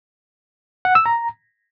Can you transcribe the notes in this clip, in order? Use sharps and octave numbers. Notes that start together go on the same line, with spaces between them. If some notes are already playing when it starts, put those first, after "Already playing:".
F#5
E6
A#5